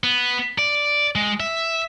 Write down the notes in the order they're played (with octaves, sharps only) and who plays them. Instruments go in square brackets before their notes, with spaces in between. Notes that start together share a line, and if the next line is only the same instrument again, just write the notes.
[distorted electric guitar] B3
D5
G#3
E5